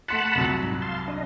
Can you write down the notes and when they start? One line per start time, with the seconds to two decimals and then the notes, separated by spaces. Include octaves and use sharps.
0.08 A3 F#5 A5 B5 C6 F#6
0.35 C2 F2 F#3
0.63 G#2
0.82 F5 A5 C6
1.08 D4 D#5